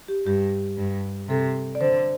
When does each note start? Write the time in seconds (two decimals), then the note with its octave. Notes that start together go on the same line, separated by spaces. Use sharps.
0.08 G4
0.26 G2 G4
0.78 G2
1.29 C3 A4
1.75 D5
1.81 D3 C5